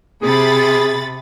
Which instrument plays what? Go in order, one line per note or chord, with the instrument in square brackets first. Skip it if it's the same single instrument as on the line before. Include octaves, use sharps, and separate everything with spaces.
[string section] C3 B5 A6 [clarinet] G#4